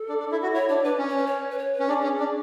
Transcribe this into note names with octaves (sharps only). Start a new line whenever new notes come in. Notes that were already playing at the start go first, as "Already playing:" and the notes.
Already playing: A4
D4
D4
E4
F#4
E4 C#5
D4 C#5
D4 B4
C#4
C#5
B4
C#5
B4
C#5
B4
C#4
D4 G#4
C#4
D4